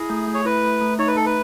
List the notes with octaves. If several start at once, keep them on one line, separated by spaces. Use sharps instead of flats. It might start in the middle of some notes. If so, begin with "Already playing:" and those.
Already playing: E4 G#4
A3
A3
C#5
E4 B4
A3
A3
D#4 C#5
B4
A3 A4
B4